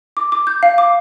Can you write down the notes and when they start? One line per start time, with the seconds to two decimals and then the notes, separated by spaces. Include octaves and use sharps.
0.17 D6
0.32 D6
0.47 G6
0.63 F5
0.78 D6